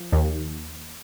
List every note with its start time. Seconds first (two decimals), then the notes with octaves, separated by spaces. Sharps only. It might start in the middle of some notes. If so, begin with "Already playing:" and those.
Already playing: F3
0.12 D#2